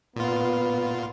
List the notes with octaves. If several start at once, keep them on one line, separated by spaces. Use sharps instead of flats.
A#2 B3 F4